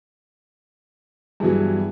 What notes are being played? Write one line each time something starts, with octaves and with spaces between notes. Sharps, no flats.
G2 E3 F#3 G3 B3 G#4